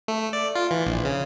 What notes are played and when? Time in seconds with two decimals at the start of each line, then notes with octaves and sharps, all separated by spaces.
0.08 A3
0.33 D5
0.55 F4
0.71 E3
0.86 A#1
1.05 C#3